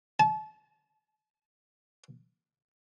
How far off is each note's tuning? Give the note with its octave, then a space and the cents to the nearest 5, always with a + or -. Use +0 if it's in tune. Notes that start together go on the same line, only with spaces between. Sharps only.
A5 -35